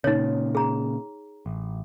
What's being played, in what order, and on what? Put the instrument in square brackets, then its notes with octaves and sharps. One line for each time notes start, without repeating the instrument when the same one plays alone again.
[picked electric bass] A#2 C#3 [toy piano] D#4 C#5
[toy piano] G#4 A#5
[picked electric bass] A1